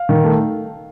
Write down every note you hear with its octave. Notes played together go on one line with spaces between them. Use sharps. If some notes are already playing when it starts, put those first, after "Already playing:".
Already playing: F5
D#3
A3